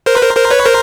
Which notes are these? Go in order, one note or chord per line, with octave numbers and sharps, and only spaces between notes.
A#4 C5
B4
A#4 C5
A#4 C5
B4 C#5
A#4 C5